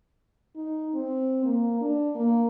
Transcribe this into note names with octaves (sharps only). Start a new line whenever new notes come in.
D#4
C4
A#3
D4
A#3